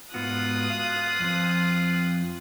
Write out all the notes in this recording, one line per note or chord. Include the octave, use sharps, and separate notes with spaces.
G#2 B3 F4 F#4 D#6 F#6
F5
F2 F3 C4